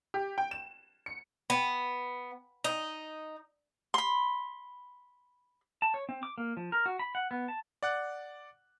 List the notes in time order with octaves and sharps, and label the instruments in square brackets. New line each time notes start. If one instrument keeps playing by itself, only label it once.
[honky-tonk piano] G4
G5
E7
C#7
[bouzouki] B3
D#4
[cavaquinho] B5 C6
[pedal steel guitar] A5
C#5
C4
D6
A#3
F3
A#4
F#4
B5
F#5
B3
A5
[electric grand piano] D5 F#5 F#6